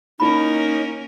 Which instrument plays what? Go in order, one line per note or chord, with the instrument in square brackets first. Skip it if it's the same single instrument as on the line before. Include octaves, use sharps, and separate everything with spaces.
[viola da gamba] A#3 C#4 A#4 [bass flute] D#4 [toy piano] E4 B5